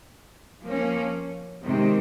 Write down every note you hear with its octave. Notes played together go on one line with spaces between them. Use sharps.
F3 A#3 C#4
C3 D#3 G#3 C4